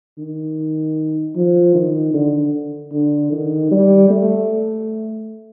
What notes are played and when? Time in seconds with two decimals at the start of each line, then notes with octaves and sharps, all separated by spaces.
0.18 D#3
1.36 F3
1.75 D#3
2.14 D3
2.92 D3
3.32 D#3
3.71 G3
4.10 A3